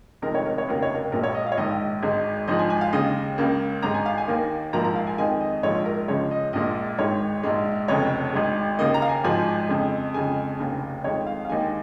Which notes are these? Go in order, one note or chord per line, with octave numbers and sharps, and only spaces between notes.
F1 F2 D#3 G#3 A#4
C#5
A#4
C#5
F1 D#2 C#3 A#4
C#5
A#4
A#1 A#2 G#3 A#4
C#5
D#5
F5
C#5
A#1 G#2 D#3 D#5
G#1 G#2 G#3
G#1 G#2 F3 D#5
G#5
G#5
F5
D#2 C#3 G#3 D#5
C#2 C#3 A#3
G#1 G#2 G#3 A#5
G#5
F5
G#5
D#2 D#3 A#3
A#1 G#2 F3 A#3 A#5
A#5
F5
G#5
F2 D#3 G#3 G#5
D#5
D#5
A#1 G#2 F3 G#3 C#5
A#4
C#2 C#3 F3 G#3 C#5
D#5
A#1 A#2 G#3 D#5
G#1 G#2 D#3 G#3 C#5
A#1 G#2 G#3
F1 F2 C#3 C#5
G#1 G#2 G#3
D#2 C#3 A#3 D#5
A#5
F5
G#5
G#1 G#2 F3 G#3 G#5
F2 C#3 G#3
F2 C#3 G#3 G#5
F1 D#2 C#3
F2 D#3 G#3 C#5
F5
F5
D#2 D#3 G#3 G#5